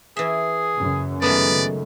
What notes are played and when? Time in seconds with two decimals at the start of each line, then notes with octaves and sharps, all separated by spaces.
0.17 E3 G#4 E5
0.76 F#1 F#2 C#3
1.22 D#3 G#3 A3 B3 D5